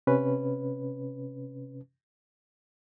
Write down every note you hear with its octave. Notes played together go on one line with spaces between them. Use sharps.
C3 C#4 B4